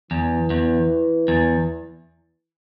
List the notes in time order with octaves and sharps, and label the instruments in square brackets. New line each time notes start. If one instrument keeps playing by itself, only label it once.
[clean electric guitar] E2 [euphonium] E3
[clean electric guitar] E2
E2